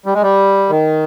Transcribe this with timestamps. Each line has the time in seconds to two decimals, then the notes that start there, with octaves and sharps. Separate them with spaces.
0.06 G3
0.14 G#3
0.22 G3
0.69 D#3